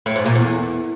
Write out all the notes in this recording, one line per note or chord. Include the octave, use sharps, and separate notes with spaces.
A2
G#2
A#2
E2